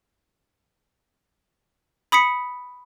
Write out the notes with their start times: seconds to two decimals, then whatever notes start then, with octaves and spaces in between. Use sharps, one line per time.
2.12 B5 D#6 B6 C#7